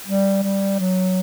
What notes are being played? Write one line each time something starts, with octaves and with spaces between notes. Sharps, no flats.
G3
G3
F#3